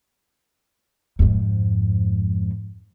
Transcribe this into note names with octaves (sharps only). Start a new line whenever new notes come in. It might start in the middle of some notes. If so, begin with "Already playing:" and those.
F2 G#2